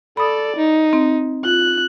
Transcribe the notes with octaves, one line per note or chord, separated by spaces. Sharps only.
A4 D5 B5 D#6
D#4
C4
F4 F#6